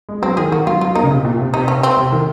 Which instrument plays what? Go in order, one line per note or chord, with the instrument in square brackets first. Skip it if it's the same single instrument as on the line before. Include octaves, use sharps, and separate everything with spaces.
[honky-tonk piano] G#3
[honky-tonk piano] F#3 [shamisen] C4
[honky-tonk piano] D#3 [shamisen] G#4
[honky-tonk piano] D#3 [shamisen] F#4
[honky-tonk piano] F#3 [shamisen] F4
[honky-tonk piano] F#3 [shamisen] F4
[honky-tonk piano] A#3 [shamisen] D#4
[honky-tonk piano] C#3
C3
A#2
C3
[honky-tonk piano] C3 [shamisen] D#4
[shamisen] C#4
C4
[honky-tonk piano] C3
D#3